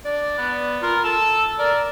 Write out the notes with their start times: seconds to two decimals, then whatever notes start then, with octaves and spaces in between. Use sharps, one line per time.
0.05 D4 D5
0.38 B3
0.82 F4 A#4
1.04 A4 E6
1.59 A#4 D5